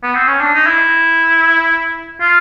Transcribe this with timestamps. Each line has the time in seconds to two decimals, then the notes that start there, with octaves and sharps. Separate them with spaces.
0.03 B3
0.15 C4
0.28 C#4
0.41 D4
0.54 D#4
0.67 E4
2.21 F4